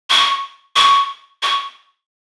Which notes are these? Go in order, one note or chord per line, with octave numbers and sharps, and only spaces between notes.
C#6
C#6
C#6